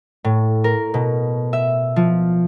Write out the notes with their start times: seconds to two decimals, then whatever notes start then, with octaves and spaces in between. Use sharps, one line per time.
0.24 A2
0.64 A#4
0.94 B2
1.53 E5
1.96 F3